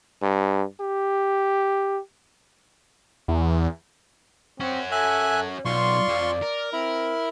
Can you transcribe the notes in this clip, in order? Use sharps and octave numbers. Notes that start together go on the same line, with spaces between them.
G2
G4
E2
C4 C#4 F#4
A4 E5 G#5 F#6
B1 F4 D5 C6 C#6
F2
A#4
C4 E4